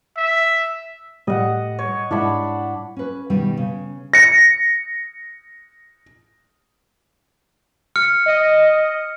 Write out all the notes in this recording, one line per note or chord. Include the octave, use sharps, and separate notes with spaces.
E5
A2 G3 A3 D#5 F#5
C#5
G#2 G3 D4 E4 F#5 B5
C#4 B4
B2 D#3 G3
C#3
A#6 C#7
F6 C#7
D#5